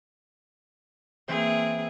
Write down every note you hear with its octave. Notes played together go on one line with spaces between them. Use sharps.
E3 A#3 C4 G#4 C5